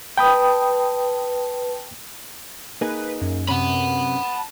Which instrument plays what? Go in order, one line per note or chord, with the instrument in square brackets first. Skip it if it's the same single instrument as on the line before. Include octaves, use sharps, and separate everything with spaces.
[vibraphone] B4 A5 [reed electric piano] G5 B5 D#6
[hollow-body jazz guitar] A#3 D#4 G#4 [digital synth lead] B4
[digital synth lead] F#2
[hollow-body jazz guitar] C3 C#4 [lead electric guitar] F#5 B5
[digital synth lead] A5